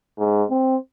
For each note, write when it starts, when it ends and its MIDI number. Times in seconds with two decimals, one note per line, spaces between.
0.18 0.44 44
0.50 0.76 60